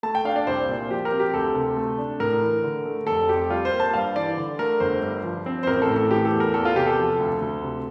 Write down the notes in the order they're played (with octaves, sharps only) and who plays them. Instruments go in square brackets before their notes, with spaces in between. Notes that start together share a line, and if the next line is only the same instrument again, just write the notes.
[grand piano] A3 A5
G5
D4 F5
D5
C2 C5
A#2
F3 G4
A#4
C4
G4
D2 A4
C3
A3
D4
A2 A#4
E3
D3
A3
F1 A4
F2 G4
G3 F4
C5
A#3
A5
G2 F5
E3 D5
D3
A3 A#4
G1 C5
G2
F3
C4
C5
A1 A#4
A4
A2
A4
E3 G4
A4
E2
A#4
E2 A4
F4
C3 G4
A4
F3
D2
D2
C3